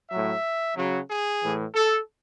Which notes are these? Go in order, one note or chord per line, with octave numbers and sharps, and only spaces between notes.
A2 F#3 E5
C#3 F#3
G#4
A2 E3
A4